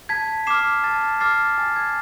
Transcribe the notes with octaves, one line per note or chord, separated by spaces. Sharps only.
A5 G#6 B6
D6 F6 C7 E7
A5 A6
D6 F6 A6 C7
G#5 A6
G#6